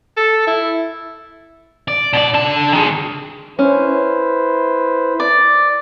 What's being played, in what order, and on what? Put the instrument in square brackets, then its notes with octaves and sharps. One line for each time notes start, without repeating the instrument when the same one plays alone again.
[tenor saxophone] A4
E4
[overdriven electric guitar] D5
B2 D5
D3 A5
D#3 G#3
[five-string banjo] C#4 [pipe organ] E4 B4 C5
[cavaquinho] D5